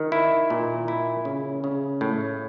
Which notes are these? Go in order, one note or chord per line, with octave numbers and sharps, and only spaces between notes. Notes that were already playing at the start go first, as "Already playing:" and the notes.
Already playing: D#3
E4
A#2
E4
C#3
C#3
A2